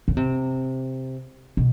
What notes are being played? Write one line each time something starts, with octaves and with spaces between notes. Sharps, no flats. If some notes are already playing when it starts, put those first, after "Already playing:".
C#3
C3
B2